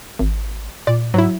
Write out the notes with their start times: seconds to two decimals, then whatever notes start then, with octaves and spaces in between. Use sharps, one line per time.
0.19 G#1
0.87 A#2 D5
1.14 G#2 F#3 E4